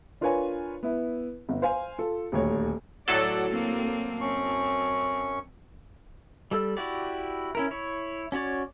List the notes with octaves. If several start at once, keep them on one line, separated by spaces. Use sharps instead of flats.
D4 F4 A#4 B4 C#5 G#5
B3 E4
G1
C5 F5 G#5
F4 A4
D#1 D2 C#5
A2 F#3 A4 D5 F#5
A#3 C4
F#2 C4 C#4 C#6
G3 A4 D5 E6
E4 F#4 G4 D5
C#4 E4 A#4
E4 C#5
C#4 F#4 C#5 D5